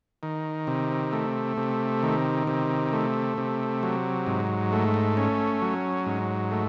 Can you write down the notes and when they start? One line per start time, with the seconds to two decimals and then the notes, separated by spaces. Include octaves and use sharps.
0.23 D#3
0.67 C3
1.13 A3
1.57 C3
2.03 D#3
2.47 C3
2.93 A3
3.38 C3
3.83 F#3
4.27 G#2
4.73 A3
5.17 C#4
5.62 F#3
6.06 G#2
6.51 A3